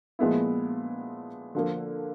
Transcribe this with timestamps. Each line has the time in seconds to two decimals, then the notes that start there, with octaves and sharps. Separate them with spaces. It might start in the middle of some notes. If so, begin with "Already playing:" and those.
0.19 A#2 F3 G#3 B3 E4
1.55 D3 F3 A#3